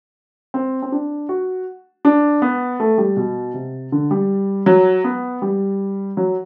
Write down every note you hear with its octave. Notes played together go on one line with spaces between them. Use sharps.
C4
C4
D4
F#4
D4
B3
A3
G3
B2
C3
D3
G3
F#3
B3
G3
F#3